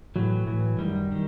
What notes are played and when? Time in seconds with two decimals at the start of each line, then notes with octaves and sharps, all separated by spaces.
0.16 A2 E3 F#3
0.47 A2 E3
0.78 F#2 D#3 G3
1.12 D#3